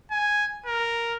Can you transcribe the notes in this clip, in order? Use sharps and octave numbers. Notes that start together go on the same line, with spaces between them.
G#5
A#4